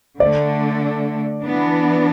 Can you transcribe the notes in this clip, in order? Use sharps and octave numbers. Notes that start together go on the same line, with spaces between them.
D3 A3 D4 D5
E3 B3 D4